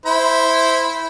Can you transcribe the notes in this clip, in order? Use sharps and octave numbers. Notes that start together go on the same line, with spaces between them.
E4 C5 B5